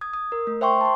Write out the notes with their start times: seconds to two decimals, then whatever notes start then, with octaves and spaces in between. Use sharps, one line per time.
0.01 D#6 G#6
0.14 D#6
0.32 A#4
0.47 A3
0.61 C5 E5 G5 C6 C#6
0.81 A5 C6